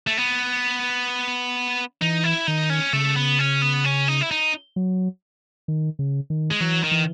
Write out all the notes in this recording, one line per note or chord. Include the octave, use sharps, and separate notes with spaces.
A3
B3
E3 D#4
E4
D#3 D#4
C#4
C#3 A3
B3
C#4
B3
C#4
D#4
E4
D#4
F#3
D#3
C#3
D#3
G#3
E3 F#3
D#3
E3